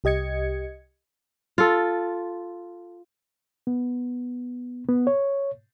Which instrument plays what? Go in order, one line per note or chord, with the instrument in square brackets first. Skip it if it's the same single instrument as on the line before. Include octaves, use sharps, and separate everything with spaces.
[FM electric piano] C2 G4 D#5 G#6 C#7
[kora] F4 A4
[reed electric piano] B3
B3
C#5